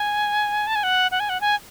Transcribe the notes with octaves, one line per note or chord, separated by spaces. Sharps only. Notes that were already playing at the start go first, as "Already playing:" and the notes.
Already playing: G#5
A5
G#5
F#5
F#5
G#5
F#5
G#5